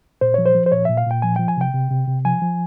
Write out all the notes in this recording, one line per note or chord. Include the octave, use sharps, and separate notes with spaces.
A#2 C5
F3 C#5
C5
F3
C5
A#2 C#5
A#2 E5
F5
A#2 G5
F3 G#5
F3 G5
G#5
C3 G5
C3
C3
C3
F3 G#5
F3